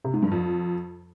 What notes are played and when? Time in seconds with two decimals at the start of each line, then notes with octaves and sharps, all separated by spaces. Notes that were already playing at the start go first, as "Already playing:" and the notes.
0.05 C3
0.14 G#2
0.23 G2
0.32 F2